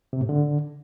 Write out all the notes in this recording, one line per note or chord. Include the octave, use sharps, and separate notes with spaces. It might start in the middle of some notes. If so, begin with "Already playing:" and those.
C3
A2
D3